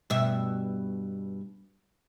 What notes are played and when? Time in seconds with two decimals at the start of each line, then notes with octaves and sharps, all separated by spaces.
0.10 G2 B2 E5